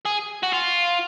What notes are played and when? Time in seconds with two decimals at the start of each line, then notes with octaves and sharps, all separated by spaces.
0.05 G#4
0.43 F#4
0.53 F4